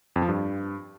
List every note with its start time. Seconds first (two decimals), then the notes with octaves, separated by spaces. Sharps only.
0.16 F2
0.22 F3
0.28 G2